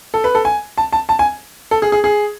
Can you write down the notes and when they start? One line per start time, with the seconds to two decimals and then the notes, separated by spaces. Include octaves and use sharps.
0.14 A4
0.24 B4
0.35 A4
0.45 G#5
0.78 A5
0.93 A5
1.09 A5
1.19 G#5
1.71 A4
1.82 G#4
1.92 G#4
2.04 G#4